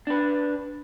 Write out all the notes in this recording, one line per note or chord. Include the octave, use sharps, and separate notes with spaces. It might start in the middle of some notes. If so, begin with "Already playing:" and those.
D4 B4